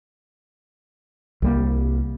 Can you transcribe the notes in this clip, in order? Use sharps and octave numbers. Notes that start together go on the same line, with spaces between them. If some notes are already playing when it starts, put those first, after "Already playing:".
C2 G3 A#3